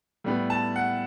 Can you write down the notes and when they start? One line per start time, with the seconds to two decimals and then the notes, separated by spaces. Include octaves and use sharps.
0.24 A2 G3 B3
0.50 A5
0.76 F#5